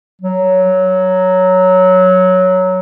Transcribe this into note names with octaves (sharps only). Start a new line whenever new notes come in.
F#3